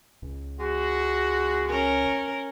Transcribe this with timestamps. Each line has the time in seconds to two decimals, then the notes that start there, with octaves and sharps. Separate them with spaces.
0.22 C#2
0.59 G#3 F#4
1.69 C#4 A#4